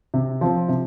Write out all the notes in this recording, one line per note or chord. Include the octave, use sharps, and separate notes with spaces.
C3
F3 C4
C3